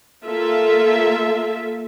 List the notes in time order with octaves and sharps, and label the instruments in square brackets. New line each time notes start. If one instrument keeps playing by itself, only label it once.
[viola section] A#3 F4 A4 E5